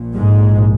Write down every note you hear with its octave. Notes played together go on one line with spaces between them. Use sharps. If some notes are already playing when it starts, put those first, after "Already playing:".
Already playing: A#1 A#2
G#2 G#3